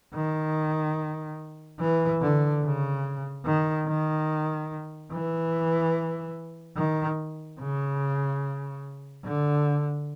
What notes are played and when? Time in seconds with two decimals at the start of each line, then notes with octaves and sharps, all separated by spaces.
0.14 D#3
1.80 E3
2.21 D3
2.63 C#3
3.45 D#3
3.87 D#3
5.12 E3
6.76 D#3
7.60 C#3
9.25 D3